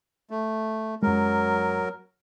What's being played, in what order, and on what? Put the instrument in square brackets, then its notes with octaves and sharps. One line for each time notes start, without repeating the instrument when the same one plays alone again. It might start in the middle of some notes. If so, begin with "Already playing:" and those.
[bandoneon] A3
[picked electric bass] F#2 G#3 [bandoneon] F#3 A#4